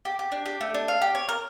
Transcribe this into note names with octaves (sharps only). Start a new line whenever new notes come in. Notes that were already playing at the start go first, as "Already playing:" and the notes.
G4
G4
D4
G4
A3
D4
F5
G4
C#5
A#4